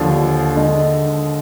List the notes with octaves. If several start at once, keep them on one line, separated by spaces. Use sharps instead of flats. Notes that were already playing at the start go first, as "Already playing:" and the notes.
Already playing: D#2 D3 F3
D3 G#3 D#4